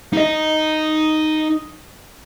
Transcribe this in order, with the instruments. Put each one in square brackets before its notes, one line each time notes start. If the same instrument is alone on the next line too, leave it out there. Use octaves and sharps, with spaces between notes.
[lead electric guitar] D#4 D#5